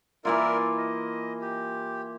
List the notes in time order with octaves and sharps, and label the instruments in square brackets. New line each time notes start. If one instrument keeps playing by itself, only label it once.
[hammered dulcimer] E3 A#3 F4 [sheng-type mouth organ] E4 A#4 D5
[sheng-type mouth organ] D#5
G4